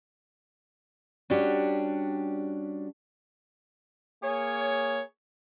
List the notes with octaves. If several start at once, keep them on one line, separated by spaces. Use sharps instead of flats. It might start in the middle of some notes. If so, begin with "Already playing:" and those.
G3 C#4 D4 F#4 G4
A#3 G#4 C#5